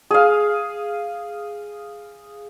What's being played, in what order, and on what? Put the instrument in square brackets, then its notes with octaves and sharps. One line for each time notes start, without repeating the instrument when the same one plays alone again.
[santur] G#4 F5